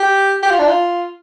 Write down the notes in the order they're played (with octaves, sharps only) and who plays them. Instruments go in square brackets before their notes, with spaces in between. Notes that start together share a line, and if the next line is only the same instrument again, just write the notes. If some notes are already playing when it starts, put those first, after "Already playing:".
Already playing: [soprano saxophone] G4
G4
F4
D4
F4